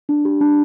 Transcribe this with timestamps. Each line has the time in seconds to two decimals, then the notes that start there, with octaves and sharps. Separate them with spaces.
0.09 D4
0.25 G4
0.41 D4